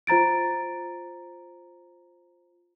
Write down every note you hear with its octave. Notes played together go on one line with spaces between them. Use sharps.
F4 C5 A#5 A6 D7